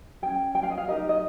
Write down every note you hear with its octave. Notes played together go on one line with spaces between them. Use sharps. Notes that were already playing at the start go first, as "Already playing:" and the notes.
C#4 G#4 G5
G5
F5
D#5
F5
D#4 G4 A#4 D#5
D#5